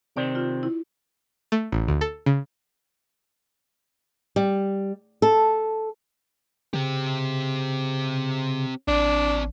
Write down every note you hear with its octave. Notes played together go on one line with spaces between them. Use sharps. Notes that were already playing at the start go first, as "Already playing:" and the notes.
C3 D#3 C4 D5
F4
E4
A3
A1
D2
A4
C#3
G3
A4
C#3 C4 G4
A1 C4 D4 D5